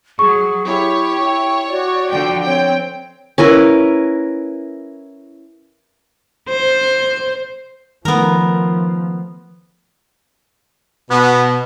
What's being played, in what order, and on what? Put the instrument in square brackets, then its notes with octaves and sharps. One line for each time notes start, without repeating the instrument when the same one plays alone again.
[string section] F#3 [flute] G#4 [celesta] C#6
[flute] E4 [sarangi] G4 [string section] C#5
[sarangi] E4 [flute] G5
[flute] F#4 [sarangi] D5
[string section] D3 F3 G5
[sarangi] C4 [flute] C#5 [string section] G5
[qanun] C#4 E4 A#4 B4
[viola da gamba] C5
[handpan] D#3 A3 [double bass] F3 [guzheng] B3 A#4
[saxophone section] B2 [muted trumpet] B3